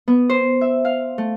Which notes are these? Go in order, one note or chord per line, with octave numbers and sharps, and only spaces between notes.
B3
C5
E5
F5
A3